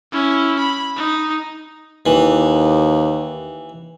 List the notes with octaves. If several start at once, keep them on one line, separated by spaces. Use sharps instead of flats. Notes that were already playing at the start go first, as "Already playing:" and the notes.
C#4 E4
B5
D#4
D#2 E3